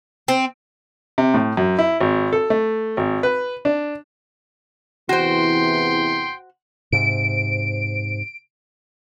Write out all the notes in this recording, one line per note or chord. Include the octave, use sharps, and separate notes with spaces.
C4
C3
A2
F#2
E4
G#1
A4
A3
G#1
B4
D4
E2 C3 E3 F#4 C5 G5 C6
G#2 C3 D7